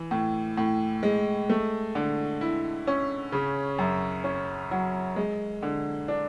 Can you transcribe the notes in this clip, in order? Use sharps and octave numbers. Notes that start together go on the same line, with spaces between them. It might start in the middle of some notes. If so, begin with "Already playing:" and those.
Already playing: E3
A2
A2
G#3
A3
D3
E4
C#4
C#3
F#2
C#4
F#3
G#3
D3
D4